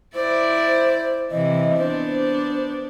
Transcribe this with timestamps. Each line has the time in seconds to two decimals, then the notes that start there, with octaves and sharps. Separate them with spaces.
0.15 E4 C5 D5
1.31 C3 E3 D#5
1.78 B3 D4 C5